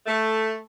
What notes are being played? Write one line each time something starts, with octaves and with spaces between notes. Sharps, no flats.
A3